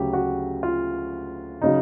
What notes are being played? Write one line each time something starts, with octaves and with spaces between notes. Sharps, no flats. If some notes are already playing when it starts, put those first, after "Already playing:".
Already playing: D2 C#3 F#3 G4
F#4
F4
C#3 F#3 D#4